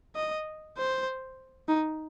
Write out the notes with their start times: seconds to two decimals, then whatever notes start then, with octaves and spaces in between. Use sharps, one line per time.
0.15 D#5
0.77 C5
1.68 D#4